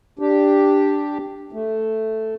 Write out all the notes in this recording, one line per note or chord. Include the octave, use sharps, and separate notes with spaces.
D4 G4
A3